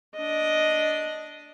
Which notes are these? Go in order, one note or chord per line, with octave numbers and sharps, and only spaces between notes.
D4 D#5